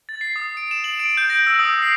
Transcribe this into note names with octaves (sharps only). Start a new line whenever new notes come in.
A6
C7
D#6
D7
E7
F#7
D7
G6
A#6
E6
D#6
C7